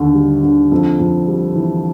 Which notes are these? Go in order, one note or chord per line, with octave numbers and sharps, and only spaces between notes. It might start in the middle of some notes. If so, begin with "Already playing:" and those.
Already playing: D#2 D3
G3
D3
F2
F2
G3
E3